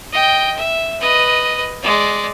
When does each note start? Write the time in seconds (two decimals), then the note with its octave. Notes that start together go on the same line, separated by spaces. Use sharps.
0.12 D#5 G5
0.56 E5
1.00 B4 D#5
1.82 G#3 D5